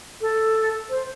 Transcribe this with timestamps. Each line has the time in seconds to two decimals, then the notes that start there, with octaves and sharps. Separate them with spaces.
0.21 A4
0.89 C5